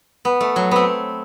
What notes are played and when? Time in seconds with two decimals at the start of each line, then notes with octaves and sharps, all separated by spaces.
0.25 B3
0.41 A3
0.56 F#3
0.71 B3 C4